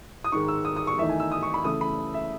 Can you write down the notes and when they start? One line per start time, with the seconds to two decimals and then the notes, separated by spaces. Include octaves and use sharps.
0.24 D#6
0.32 G#2 D#3 G#3 C#6
0.48 E6
0.65 D#6
0.76 D#6
0.87 C#6
0.99 E2 D#3 A3 D#4 E5
1.09 G#5
1.20 E6
1.32 D#6
1.43 C#6
1.54 B5
1.64 C#3 E3 A3 D#6
1.81 B5
2.14 E5